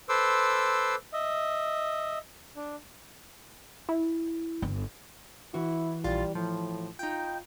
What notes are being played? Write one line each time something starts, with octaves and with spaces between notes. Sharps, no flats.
A4 B4 C5 C6 D6 E6
D#5 E5
D4
E4
G1
E3 E4 F#4
A#1 G3 F4 A6
A2 F3
D#4 F4 G5